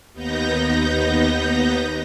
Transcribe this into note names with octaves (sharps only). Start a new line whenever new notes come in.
D#2 B3 D#4 G6 A#6